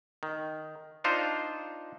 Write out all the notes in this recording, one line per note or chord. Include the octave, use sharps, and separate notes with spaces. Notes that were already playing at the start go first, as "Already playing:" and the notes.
D#3
D4 D#4 F4 C5